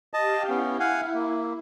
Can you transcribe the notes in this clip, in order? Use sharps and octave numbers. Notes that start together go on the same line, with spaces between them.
G4 D#5 F5 G5 A5
B3 C#4 E4
F5 F#5 G#5
A#3